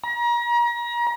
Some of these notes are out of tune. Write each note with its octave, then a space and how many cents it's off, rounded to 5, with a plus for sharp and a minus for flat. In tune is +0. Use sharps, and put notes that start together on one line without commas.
A#5 +35